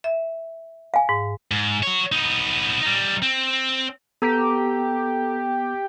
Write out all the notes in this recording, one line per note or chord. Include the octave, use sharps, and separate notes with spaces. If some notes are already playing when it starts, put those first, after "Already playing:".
E5
F5 G#5
G#2
G#2
F#4 C#5
B3 D#4
G3 D#4
C4
B3 G4 A4 A#5